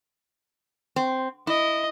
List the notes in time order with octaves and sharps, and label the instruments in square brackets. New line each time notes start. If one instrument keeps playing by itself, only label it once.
[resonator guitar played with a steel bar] C4
[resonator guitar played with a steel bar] E4 [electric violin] D#5